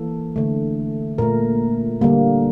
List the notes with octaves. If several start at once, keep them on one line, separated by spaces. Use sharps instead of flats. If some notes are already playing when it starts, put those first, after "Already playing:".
Already playing: E3 A#3 A4
D3 A3
A#2 A3 A#4
D3 G3 A#3